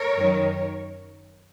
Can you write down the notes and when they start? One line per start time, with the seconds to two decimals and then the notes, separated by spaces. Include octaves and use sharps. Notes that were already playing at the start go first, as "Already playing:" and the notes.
Already playing: A#4 C#5
0.16 F#2 D#3 F#3